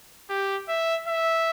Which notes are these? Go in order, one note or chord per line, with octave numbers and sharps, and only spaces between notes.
G4
E5
E5